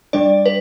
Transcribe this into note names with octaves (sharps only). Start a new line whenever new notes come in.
G3 D4 D5
B4